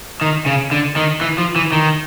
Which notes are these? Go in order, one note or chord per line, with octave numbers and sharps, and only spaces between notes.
D#3
C#3
D3
D#3
E3
F3
E3
D#3